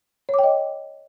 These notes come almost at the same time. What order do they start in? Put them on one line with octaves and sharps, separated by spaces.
C#5 D6 G5 D#5